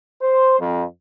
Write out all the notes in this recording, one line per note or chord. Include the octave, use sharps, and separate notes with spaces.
C5
F2